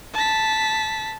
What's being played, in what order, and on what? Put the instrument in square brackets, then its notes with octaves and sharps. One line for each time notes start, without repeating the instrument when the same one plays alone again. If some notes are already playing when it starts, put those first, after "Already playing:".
[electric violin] A5 B6